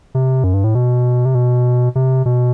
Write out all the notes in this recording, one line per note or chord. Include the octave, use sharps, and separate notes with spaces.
C3
F#2
G2
A2
B2
C3
B2
C3
B2